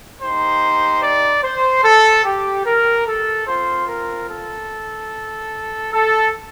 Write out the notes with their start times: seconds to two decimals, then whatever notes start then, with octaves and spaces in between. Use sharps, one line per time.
0.21 A#3 D#4 G4 C5
1.02 D5
1.43 C5
1.84 A4
2.25 G4
2.66 A#4
3.07 A4
3.48 C4 F4 C5
3.88 A#4
4.29 A4
5.93 A4